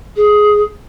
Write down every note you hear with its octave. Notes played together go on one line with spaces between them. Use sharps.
G#4